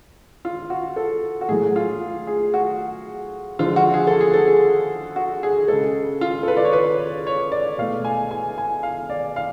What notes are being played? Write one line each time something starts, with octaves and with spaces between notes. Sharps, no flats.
F4
F#4
A4
F#4
A2 F#3 A3 G#4
F4
G#4
F#4
D3 F3 G#3 F4
F#4
G#4
A4
G#4
A4
G#4
F#4
G#4
C#3 G#3 A4
F4
A4
B4
D5
C#5
B4
C#5
D5
B2 A3 F5
G#5
G#5
G#5
F5
D5
F5